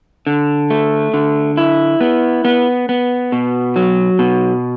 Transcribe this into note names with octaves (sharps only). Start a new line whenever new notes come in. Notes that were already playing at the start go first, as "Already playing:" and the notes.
D3
A3
D3
E4
B3
B3
B3
B2
F#3
B2